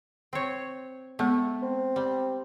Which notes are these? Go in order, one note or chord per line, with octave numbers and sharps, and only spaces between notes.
C4 C#5
G#3 A3 B3 F#5
C4
G3